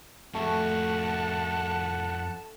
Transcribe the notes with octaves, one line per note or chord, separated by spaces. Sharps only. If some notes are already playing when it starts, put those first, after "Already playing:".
F2 A3 F#4 F#5 A5